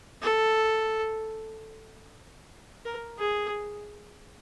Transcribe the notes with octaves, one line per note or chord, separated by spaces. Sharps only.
A4
A#4
G#4